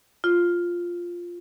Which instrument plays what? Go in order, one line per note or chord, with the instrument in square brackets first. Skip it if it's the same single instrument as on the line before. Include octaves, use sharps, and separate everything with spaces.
[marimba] F4